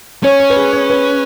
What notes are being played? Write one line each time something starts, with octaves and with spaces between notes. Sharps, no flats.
C#4 C#5
C#5
B4
G#4
B4
B4